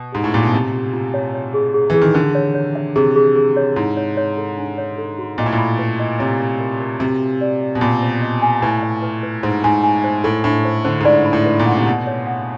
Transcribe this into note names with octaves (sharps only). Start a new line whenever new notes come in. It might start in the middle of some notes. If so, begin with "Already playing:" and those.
Already playing: B2
G#2 G4
A2
A#2 G4
B2
C3 F4
F4
F4
C#5
C#5
G#4
G#4
E3 G#4
D#3
D3 A#4
C#5
C#5
E5
C3 G#4
G#4
G#4
C#5
G#2 E4
C#5
C#5
A4
D4
C#5
A4
F#4
A#2 D#5
A2
A#2
B5
B4
D#5
C3 C#5
A#4
A#4
A#4
C3 F#4
F#4
D5
D5
B2
A#2 B5
C5
D#5
G#5
A2 B4
E5
B4
B4
G#2 C5
G#2 G#5
G#5
C5
A2 A4
A2 D4
C5
D3 C5
G#2
A2 D5
B5
A2
B4
A#2
F#5
C3
B2 F#5
C#5
F#5